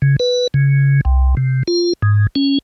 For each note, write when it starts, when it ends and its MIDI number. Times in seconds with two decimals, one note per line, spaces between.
0.02 0.16 49
0.20 0.47 71
0.54 1.01 49
1.05 1.35 36
1.37 1.63 48
1.68 1.93 65
2.02 2.27 44
2.35 2.58 61